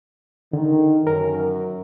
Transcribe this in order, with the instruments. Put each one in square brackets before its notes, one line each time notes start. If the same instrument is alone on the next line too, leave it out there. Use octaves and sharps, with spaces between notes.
[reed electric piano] D3 [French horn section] D#3
[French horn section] F#2 [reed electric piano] A#4